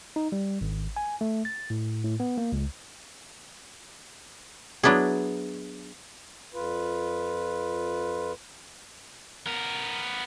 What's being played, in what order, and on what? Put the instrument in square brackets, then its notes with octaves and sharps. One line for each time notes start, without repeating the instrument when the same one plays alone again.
[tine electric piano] D#4
G3
G#1
G#5
A3
A6
A2
A2
B3
A#3
C#2
[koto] F#3 B3 D4 E4 G#4
[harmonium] F2 F4 B4
[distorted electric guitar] B3 A#4